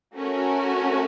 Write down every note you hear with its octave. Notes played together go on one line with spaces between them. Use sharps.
A3 C#4 F#4 A#4